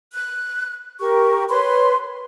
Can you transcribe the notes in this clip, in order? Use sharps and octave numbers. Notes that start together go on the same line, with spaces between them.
F#6
G4 A#4 C#6
B4 C#5 B5 C6